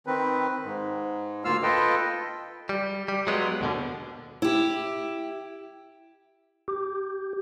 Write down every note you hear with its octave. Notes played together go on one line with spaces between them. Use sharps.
D#3 C4 B4
G#2
D2 A#3 F4 F5 E6 F6
F4 A4 B4 D#5 G5
G3
G3
F#3 G#3 B3 F4
D#2 B2 D3
E4 G4
G4